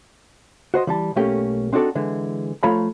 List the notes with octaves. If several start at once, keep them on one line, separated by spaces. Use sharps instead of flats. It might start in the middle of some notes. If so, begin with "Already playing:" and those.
F#4 C5 D#5
E3 G3 A5
B1 A3 A#3 C#4 G4 G5
C4 D4 D#4 F#4 A4 D5
D3 E3 G#3
F3 A3 F4 C#5 A#5 B5